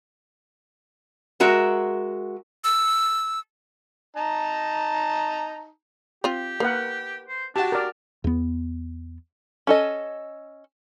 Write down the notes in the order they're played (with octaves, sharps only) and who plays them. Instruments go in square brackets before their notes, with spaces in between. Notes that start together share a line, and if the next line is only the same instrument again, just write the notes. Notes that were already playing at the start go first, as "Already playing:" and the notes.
[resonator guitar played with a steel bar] G#3 F#4 A#4 E5
[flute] E6
[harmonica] D#4 A5 A#5
[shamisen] C4 F4 [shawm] G4
[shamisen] A#3 [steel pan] A#4 B4 F#5
[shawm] C5
[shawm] D4 [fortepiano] F#4 G4 [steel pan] A5
[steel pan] A#4 D5
[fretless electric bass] E2 B3
[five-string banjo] C#4 A4 D#5